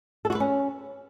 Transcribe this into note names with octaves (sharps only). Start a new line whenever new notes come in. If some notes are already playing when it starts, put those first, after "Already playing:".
A4
F#4
B4
C#4